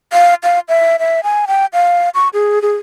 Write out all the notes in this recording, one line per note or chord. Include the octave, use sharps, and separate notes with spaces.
F5
F5
E5
E5
G#5
G5
F5
C#6
G#4
G#4